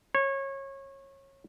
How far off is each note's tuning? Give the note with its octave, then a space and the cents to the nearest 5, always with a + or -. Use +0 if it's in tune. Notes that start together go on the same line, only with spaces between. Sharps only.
C#5 -25